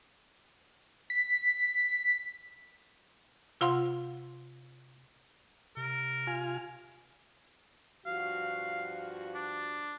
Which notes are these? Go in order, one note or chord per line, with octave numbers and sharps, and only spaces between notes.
B6
C3 F4 F5 F#5 C6
C3 A#4
F4 G#5 F6
G2 F3 F#4 F5
D4